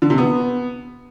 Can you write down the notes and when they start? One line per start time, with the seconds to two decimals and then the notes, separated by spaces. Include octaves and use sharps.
0.02 D3
0.10 C3
0.18 B3